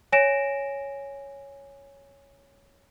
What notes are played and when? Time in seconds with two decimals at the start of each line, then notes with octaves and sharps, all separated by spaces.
0.12 C#5 G#5 A#6 D7 E7